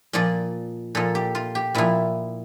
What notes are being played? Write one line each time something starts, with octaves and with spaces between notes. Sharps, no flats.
A#2 F3 D5
A#2 F3 A4
G4
F4
G4
A#2 F3 E4